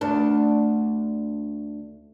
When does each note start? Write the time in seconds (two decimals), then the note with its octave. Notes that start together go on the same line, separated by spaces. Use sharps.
0.01 D2 D4